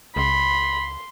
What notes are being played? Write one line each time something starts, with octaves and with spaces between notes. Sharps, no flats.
C#2 B5 C6